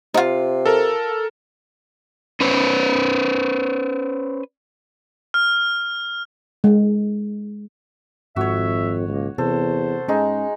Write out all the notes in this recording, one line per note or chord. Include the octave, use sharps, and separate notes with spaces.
C3 D#4 F4
A4 A#4
C#4 B4 C5
F6
G#3
G#1 F2 G#2 F#4 C#5 E5
C#2 A#3
E2 C3 A4 C5
G#2 G#3 C#4 D#4 G#4